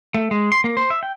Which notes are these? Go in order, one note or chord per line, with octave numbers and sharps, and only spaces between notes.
A3
G#3
C6
A#3
C5
E5
G5